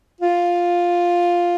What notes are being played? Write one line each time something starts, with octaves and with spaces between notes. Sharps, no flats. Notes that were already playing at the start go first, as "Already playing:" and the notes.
F4